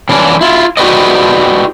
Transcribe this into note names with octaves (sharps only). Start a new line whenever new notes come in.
E3 C#4 D4
E4 F4
E4 F#4 G4 B4 D5 D#5